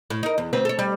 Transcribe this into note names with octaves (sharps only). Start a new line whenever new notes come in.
A2
D#4 A#4
E2
D2 C4 B4
A4 C#5
G3